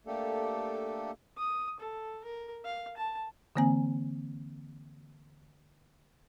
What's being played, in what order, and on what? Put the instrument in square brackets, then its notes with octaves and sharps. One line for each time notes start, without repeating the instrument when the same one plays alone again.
[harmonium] A3 A#3 D4 G4 A4
[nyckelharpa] D#6
A4
A#4
F5
A5
[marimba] D3 E3 A#3 C4 G#5